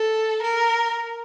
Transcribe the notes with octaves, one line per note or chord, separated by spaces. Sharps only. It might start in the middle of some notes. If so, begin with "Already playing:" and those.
Already playing: A4
A#4